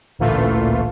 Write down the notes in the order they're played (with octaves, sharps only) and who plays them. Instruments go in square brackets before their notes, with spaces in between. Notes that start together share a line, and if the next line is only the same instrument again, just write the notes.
[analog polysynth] A1 D2 A#2 E3 A3 F4